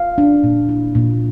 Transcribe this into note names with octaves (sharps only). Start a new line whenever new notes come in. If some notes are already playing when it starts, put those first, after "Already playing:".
Already playing: F5
D4
A#2
E4
A#2